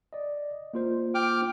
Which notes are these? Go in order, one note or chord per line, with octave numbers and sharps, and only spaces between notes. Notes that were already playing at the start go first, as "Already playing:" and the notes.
D5 D#5
A#3 F4 C5
G5 D6 F6